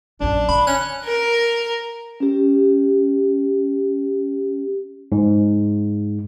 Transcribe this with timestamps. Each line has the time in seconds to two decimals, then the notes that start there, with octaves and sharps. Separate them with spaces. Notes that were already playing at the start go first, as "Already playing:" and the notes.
0.20 A#1 F#2 D4
0.49 D3 B5
0.67 C#4 F#6
1.04 A#4
2.20 C#4 G4
5.12 G#2